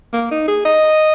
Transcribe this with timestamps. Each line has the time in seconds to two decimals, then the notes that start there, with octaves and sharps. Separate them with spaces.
0.13 A#3
0.31 D#4
0.48 G#4
0.65 D#5